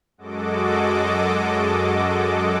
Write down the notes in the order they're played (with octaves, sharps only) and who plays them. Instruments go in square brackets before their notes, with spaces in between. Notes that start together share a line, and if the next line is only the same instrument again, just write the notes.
[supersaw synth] F#2 G#3 F#4 A4 D#5 D6